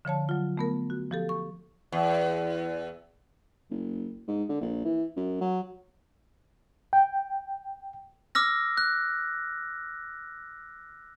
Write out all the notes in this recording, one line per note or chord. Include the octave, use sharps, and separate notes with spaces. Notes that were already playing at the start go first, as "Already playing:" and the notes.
D3 F3 C#5 A5
F#3 F4
A3 B3 A#4
F#4
F3 G4 A4
C#6
E2
F#1
G#2
D3
A#1
E3
F#2
F#3
G5
D6 E6 F6 A#6
F#6